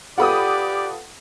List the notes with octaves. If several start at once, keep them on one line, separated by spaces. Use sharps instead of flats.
F4 G4 A4 B4 D5 F#5 B5 D#6